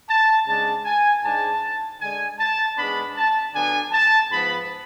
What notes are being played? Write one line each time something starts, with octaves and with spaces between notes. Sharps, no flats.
A5
C#3 G#3 D4 A5
G#5
G#2 G#3 D4 A5
D3 G#3 D4 G#5
A5
G#2 G#3 B3 D4 B5
A5
D3 F#3 B3 D4 G#5
A5
G#2 F3 B3 B5